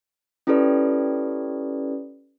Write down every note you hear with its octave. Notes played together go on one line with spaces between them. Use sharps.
C#4 E4 G4 A4 B4 D5